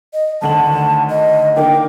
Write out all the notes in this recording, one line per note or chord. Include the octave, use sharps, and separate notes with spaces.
D#5
G#1 D2 A5 F#7
D#5
D#3 A#3 D4 G5